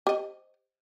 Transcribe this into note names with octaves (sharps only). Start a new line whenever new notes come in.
G4 C5 D#5